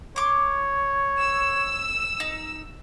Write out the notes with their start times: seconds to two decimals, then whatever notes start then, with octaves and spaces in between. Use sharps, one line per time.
0.16 C#5 C6 D6
1.21 E6
2.20 D#4